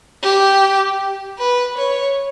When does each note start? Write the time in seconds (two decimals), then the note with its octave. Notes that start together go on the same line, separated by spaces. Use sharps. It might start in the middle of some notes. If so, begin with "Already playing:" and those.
0.22 G4
1.38 B4
1.77 C#5